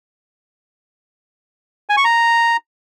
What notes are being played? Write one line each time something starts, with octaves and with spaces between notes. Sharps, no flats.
G#5
C#6
A#5